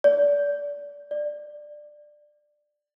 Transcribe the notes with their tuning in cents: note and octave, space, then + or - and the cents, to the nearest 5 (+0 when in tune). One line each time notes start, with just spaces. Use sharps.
D5 -25
D5 +15